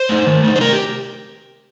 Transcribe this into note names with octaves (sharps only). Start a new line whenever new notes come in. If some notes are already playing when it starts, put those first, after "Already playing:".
Already playing: C5
A3 D#4
D#3
A3 D#4
C5
C3 A#4
G4